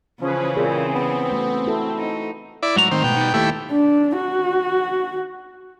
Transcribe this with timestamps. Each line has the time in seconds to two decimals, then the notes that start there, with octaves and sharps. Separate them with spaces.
0.22 C#3 E3 F3 C#4 G#4 B4
0.57 A#2 C4 G#4
0.95 B3
1.31 A3 F#4
1.67 E4 F#4 A4
1.98 D#4
2.63 E4 D5
2.76 G#2 F#3 A3 A#5
2.91 D#3 C4
3.04 B2 G5
3.17 G3 D#4
3.34 D#2 A3 E4 G4
3.72 D4
4.17 F#4